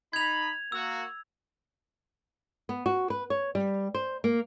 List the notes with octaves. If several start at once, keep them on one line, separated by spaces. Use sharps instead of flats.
D#4 B5 G#6 F7
A#3 F#4 E6
B3
F#4
B4
C#5
G3
C5
A#3